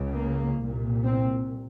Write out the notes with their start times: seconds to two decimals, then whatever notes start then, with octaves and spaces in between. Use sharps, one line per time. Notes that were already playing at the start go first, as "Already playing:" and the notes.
Already playing: C#2 C#3
0.14 A#3
0.60 C2 A#2
1.05 C4